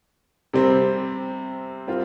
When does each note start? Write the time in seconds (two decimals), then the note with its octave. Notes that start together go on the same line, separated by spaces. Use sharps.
0.53 C3 G3 C4
1.87 G3 C4 F4